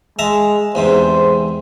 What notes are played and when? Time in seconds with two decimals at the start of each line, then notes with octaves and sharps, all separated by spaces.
0.19 G#3 E5 A5 A#5
0.75 E2 G#2 C3 C5